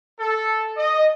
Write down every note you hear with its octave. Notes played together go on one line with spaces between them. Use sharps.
A4
D#5